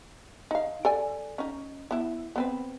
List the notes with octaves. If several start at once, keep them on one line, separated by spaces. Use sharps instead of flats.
D#4 F5
A4 D5 G#5
C#4 D#4
B3 E4
B3 C4 B4